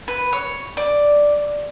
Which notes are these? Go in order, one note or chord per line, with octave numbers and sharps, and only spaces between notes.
B4
C#5
D5